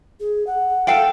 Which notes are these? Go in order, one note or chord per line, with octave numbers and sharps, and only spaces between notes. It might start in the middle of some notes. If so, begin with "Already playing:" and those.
G#4
F#5
A4 F5 G5